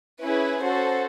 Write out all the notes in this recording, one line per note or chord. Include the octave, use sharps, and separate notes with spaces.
C#4 E4 G#4 B4
C#4 F#4 A4 C5